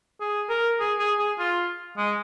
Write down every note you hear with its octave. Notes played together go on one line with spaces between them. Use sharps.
G#4
A#4
G#4
G#4
G#4
F4
G#3